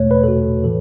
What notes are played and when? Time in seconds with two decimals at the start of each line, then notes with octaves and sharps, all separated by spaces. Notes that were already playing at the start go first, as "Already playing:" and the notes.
Already playing: E2 B2 A3 C#5
0.11 B4
0.24 A4
0.28 F#4
0.64 A2 E3 A4